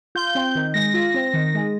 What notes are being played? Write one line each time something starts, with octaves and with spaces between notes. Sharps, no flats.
F4 G6
C4
D#3
G#3 A#6
F4
C4
D#3
G#3